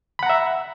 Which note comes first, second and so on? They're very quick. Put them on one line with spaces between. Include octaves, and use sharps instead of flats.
B5 F#5 A#5 E5